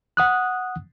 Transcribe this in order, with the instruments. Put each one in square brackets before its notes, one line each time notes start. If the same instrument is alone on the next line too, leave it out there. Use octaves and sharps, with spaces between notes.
[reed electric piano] F#5 D#6 F#6